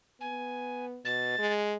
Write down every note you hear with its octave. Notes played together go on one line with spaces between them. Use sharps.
B3 G#5
B2 A6
G#3